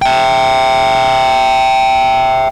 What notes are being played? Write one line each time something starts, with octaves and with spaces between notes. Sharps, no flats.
E5 G5